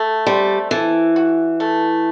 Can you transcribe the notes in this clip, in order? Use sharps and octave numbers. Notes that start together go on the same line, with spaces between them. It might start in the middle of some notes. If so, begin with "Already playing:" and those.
Already playing: A3
G3 C4
E3 A4
F#4
A3